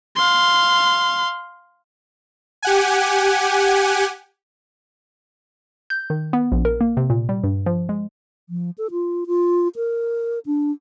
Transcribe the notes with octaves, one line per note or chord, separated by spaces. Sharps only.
F5 C6
G4 F#5 G#5
G6
D#3
B3
A#1
A#4
A#3
C3
A#2
G3
G2
F3
G#3
F3
A4
F4
F4
A#4
D4